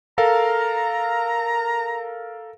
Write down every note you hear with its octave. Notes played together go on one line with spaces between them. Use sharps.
A4 A#4 F5 A#5